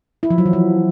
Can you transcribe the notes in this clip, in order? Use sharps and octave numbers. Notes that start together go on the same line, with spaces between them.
E4
F3
F#3
E3
F3